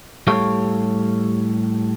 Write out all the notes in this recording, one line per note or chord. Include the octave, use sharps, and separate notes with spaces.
A2 G3 G4 A4 C#5 F5